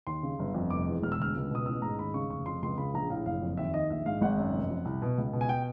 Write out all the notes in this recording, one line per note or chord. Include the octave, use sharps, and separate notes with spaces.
D#2 C6
C#3
G1
F2
F1 D6
E2
E1 F6
E6
D2 F6
C#2
B2 D#6
A1 E6
G#2 A#5
D#2 B5
C#3 C#6
F1 C#6
F2 C6
C#2 C6
C#3 B5
A#1 A#5
A2 F5
F#1 F5
F2
D#2 E5
D#3 D#5
A#1 E5
G#2 F5
G#1 F#5
F#2
F1
F2
C2
B2
C#2
B2
G#5
G5